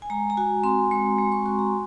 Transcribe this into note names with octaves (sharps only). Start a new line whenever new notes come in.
G#5
G#3 A#5
A#5
F#4 G#5
C4 C6
G#3 C6
G#3
C#6
F#4 C6
A#5